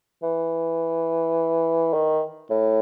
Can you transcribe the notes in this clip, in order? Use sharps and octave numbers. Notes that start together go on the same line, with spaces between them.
E3
D#3
A2